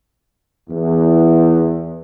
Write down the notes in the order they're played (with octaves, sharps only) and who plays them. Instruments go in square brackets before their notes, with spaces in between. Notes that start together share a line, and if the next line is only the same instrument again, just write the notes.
[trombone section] E2